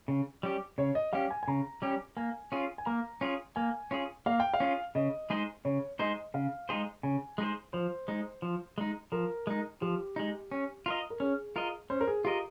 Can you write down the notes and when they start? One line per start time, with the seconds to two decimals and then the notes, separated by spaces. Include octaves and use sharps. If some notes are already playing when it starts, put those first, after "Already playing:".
0.08 C#3
0.43 G3 C#4 G4
0.78 C#3 C#5
0.95 D#5
1.13 G3 C#4 G4 F5
1.31 G#5
1.43 G#5
1.48 C#3 A#5
1.82 G3 C#4 G4
2.17 A#3 G#5
2.52 C#4 F4 G#4
2.78 G#5
2.86 A#3 A#5
3.21 C#4 F4 G#4
3.56 A#3 G#5
3.91 C#4 F4 G#4
4.26 A#3 F5
4.40 G5
4.54 F5
4.60 C#4 F4 G#4
4.95 C#3 D#5
5.30 G#3 D#4 G#4 C5
5.65 C#3 C#5
5.99 G#3 D#4 G#4 C5 D#5
6.34 C#3 F5
6.69 G#3 D#4 G#4 C5
7.03 C#3 G#5
7.38 G#3 D#4 G#4 C5
7.73 F3 C5
8.08 G#3 D#4
8.42 F3
8.78 G#3 D#4
9.12 F3 A#4
9.47 G#3 D#4
9.81 F3 G4
10.16 G#3 D#4
10.51 C#4
10.86 F4 A#4 D#5
11.10 A#4
11.20 C#4 G#4
11.56 F4 A#4 D#5
11.90 C#4 C5
12.01 A#4
12.07 G#4
12.24 F4 G4 A#4 D#5